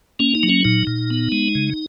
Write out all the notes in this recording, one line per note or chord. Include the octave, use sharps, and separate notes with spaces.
A#3 C#4
D#4
F#3
C#4
A#2 D#4
A#2
B3
G#3
C#3